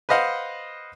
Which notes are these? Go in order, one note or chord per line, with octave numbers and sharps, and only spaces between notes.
B4 C5 D#5 F5 F#5